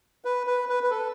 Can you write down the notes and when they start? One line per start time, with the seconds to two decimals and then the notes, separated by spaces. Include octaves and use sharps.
0.25 B4
0.47 B4
0.69 B4
0.83 B4
0.91 A4